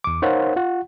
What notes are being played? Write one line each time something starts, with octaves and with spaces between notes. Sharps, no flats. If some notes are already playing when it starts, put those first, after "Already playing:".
E2 D6
D#4 A#4 C5 C#5 F5 F#5
F4 F#5